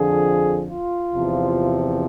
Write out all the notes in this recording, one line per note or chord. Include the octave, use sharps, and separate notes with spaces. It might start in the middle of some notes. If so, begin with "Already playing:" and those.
Already playing: F2 D3 F3 G#4
F4
E2 C3 F3